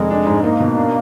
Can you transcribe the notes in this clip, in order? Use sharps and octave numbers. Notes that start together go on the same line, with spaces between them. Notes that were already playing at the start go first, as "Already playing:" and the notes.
Already playing: F1 G#3
D4
G#2
A#3 D#4
B2
D4